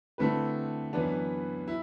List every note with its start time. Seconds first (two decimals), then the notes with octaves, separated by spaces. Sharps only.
0.18 D3 A3 C4 E4 B4
0.93 F#2 E3 B3 D4
1.68 E4